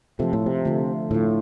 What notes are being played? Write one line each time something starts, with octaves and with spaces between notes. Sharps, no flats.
C3 F3 A3 F4 A4
A2
C3
D3 A3 F4
A2 D3 A3 F4